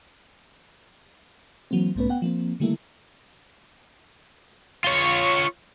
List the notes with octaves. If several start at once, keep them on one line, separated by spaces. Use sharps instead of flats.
E3 F#3 A#3 C4
B1 G#2 A3 B3 C#4 B4
B3 F#5 G5
F3 A#3 C4
D3 D#3 G3 A3 A#3 E4
F4 C#5